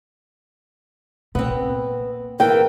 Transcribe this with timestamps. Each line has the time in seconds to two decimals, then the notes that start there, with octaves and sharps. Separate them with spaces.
1.35 A#2 B3 C4
2.40 E3 A#3 A#4 G5